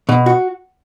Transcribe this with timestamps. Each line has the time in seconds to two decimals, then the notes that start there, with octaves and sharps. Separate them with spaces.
0.09 B2
0.26 F#4